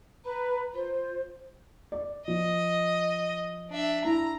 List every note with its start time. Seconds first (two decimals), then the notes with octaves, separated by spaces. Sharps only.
0.24 B4 A#5 B5
0.73 F4 C5
1.92 D5
2.28 F3 D#5
3.70 D4 E5
4.04 E4 A#5